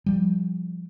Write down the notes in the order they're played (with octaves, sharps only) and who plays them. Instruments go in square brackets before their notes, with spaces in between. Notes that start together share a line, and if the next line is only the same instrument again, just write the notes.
[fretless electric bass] F3 G3